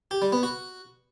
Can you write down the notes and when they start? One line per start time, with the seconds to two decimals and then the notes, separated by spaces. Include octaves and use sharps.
0.11 G4
0.22 G3
0.32 B3
0.43 F#4